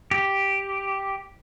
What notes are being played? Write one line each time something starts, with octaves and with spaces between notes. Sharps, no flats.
G4